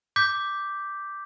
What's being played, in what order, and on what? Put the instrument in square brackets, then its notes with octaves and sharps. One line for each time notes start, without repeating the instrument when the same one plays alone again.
[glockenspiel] D6 G6 B6